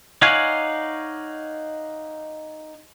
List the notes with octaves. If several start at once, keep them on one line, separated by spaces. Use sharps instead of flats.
D#4 C#5 D5 F5 F#5 G#5